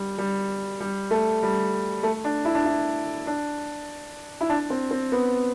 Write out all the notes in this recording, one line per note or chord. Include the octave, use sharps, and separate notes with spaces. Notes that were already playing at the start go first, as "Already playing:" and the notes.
Already playing: G3
G3
G3
A3
G3
A3
D4
E4
D4
E4
D4
E4
D4
C4
C4
B3